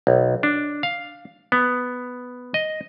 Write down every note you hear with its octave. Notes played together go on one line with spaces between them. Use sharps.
B1
D4
F5
B3
D#5